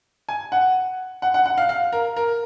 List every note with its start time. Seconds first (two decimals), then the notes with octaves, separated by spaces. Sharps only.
0.29 G#5
0.52 F#5
1.22 F#5
1.34 F#5
1.46 F#5
1.58 F5
1.69 F5
1.93 A#4
2.17 A#4